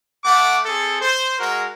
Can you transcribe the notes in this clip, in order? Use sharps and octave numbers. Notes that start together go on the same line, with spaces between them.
A3 F#5 D6
C4 G#4 A4
C5
G#3 F#4 A#4